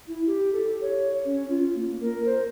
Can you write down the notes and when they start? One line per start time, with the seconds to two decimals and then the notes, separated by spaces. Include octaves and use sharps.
0.08 E4
0.26 G4
0.53 A4
0.81 C#5
1.25 C#4
1.49 F4
1.75 A#3
2.01 A#4
2.25 C5